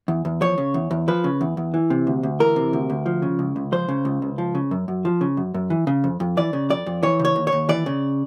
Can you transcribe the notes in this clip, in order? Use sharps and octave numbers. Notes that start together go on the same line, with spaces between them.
E2
E2
F3 C#5
C#3
E2
E2
F3 B4
C#3
E2
E2
E3
C3
D2
D2
E3 A#4
C3
D2
D2
F3
C#3
C#2
C#2
F3 C5
C#3
C#2
C#2
F3
C#3
F#2
F#2
F3
C#3
F#2
F#2
E3
C#3
F2
F2
E3 D5
C#3
F2 D5
F2
E3 C#5
C#3
C#5
D#2
C#5
D#2
E3 D5
C#3